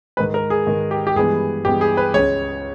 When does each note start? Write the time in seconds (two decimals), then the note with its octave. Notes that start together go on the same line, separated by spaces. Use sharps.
0.17 G#2 D#3 G#3 B4
0.34 A#4
0.50 G#4
0.67 G#2 D#3 G#3
0.91 G4
1.07 G4
1.16 G2 E3 G#3 B3 G#4
1.65 G2 E3 G#3 B3 G4
1.81 G#4
1.97 B4
2.14 C#2 C#3 G#3 C#5